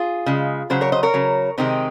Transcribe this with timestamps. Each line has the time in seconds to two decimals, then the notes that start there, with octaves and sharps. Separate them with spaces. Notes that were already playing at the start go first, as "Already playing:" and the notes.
Already playing: F4 G#4
0.26 C#3 G#3
0.70 C#3 F#3 G#4 C5
0.81 A#4 C#5
0.92 C5 D#5
1.03 A#4 C#5
1.14 C#3 F#3
1.58 C3 D#3 G#3 C4 D#4